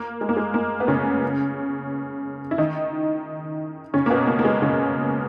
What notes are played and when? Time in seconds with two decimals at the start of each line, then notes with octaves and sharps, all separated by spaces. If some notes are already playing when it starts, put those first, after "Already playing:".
Already playing: A#3
0.21 G#3
0.29 A#3
0.37 G#3
0.54 A#3
0.80 B3
0.88 C#3 C#4
2.51 E4
2.58 D#3 D#4
3.94 C#3 C#4
4.06 A#3
4.10 B2 B3
4.27 A#3
4.39 A#3
4.45 G#3
4.62 C#3 C#4